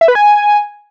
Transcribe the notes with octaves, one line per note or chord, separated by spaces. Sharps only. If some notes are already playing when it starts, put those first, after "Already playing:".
E5
B4
G#5